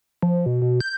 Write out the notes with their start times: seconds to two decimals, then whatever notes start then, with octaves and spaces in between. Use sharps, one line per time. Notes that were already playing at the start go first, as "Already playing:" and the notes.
0.22 F3
0.46 B2
0.62 B2
0.80 G6